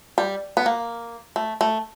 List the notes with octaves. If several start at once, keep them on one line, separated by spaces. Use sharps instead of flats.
G3
B3
A#3
A3
A3